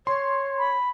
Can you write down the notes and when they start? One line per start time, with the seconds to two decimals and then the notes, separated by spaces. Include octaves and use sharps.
0.07 C#5 C6
0.59 B5